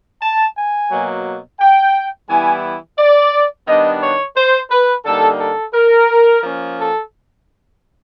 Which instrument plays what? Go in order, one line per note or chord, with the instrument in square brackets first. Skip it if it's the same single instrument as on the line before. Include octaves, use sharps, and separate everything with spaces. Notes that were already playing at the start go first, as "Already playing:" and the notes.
[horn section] A5
G#5
B2 F#3 A#3
G5
E3 G3 B3 E4 G#5
D5
D#3 G3 B3 D4 D#5
C#5
C5
B4
D3 G3 A#3 D#4 A4
A4
A#4
F3 A#3 C#4
A4